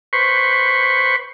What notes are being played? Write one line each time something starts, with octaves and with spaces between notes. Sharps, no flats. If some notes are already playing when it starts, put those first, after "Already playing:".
B4 C5 C#6